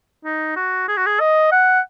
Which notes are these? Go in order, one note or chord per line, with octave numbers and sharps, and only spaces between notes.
D#4
F#4
G#4
F#4
G#4
D#5
F#5